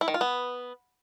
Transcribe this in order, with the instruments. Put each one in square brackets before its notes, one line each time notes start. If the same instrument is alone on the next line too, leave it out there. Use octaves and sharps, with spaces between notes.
[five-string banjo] E4
D#3
F4
B3